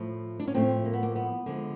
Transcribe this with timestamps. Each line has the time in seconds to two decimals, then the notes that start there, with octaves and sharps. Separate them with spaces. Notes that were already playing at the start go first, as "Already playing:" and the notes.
Already playing: A2 F3 A3
0.40 D4
0.47 C#4
0.54 A2 F3 A3 C4
0.85 A#3
0.93 B3
1.03 A#3
1.16 B3
1.46 D3 F3 G#3